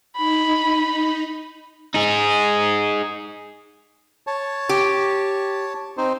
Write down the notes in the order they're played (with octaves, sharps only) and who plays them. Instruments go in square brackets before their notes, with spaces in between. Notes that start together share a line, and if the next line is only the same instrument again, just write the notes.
[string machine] D#4 [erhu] B5
[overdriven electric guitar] D#4 G#4
[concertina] C#5 A5
[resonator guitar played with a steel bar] G4
[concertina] C4 D#4 C5